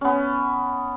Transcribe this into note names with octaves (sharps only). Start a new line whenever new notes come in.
B3 C#4